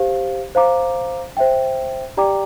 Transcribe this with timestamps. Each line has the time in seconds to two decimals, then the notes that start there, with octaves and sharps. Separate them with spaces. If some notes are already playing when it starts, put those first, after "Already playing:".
Already playing: G4 C5 F5
0.55 C5 F5 A#5 D6
1.37 C5 E5 G5
2.17 G4 D5 G5 A#5 D6